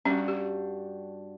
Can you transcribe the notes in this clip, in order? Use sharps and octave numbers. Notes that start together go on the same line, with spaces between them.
G2 C#4 F#4
G4